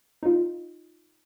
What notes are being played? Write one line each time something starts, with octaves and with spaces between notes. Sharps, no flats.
D#4 F4